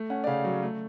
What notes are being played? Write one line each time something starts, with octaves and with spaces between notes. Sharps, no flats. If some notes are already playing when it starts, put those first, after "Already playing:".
Already playing: A3
C#4 F#5
D5
C#3 F5
F#3
A3